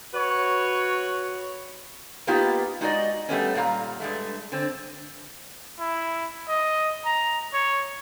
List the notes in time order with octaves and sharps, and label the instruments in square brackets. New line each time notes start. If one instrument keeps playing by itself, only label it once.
[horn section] F#4 B4 C#5
[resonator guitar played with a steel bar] A#3 B3 D#4 F4 G4
G#3 D#4 F#4 A4 D5 D#5
G3 A3 B3 C#4
A#2 G3 F5 A#5
G2 G#3 A3
D3 C4
[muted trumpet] E4
D#5
A#5
C#5